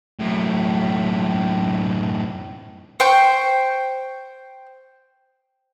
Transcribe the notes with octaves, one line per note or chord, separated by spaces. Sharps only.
F#2 A2
C5 G5 C#6